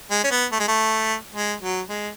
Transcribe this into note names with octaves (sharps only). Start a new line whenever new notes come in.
G#3
C#4
B3
A3
G#3
A3
G#3
F#3
G#3